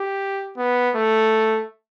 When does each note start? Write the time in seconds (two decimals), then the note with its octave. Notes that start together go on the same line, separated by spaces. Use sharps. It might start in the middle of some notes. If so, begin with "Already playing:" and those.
Already playing: G4
0.57 B3
0.95 A3